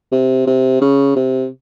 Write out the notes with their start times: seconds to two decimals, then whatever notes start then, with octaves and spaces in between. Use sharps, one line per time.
0.12 C3
0.47 C3
0.81 C#3
1.16 C3